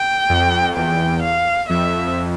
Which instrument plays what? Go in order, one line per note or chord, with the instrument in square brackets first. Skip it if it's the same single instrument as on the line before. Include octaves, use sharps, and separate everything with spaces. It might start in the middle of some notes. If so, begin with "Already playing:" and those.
Already playing: [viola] G5
[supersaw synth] F2
[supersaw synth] E2 [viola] G5
[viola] F5
[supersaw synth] F2 [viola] E5